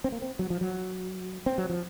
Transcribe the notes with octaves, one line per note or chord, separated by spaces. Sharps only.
C4
A#3
C4
F#3
F3
F#3
C4
F#3
F3